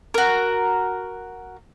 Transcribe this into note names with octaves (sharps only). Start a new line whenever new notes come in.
F#4 A#4